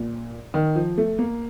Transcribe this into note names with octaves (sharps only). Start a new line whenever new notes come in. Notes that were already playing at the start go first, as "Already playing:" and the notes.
Already playing: A#2
D#3
F3
A3
A#3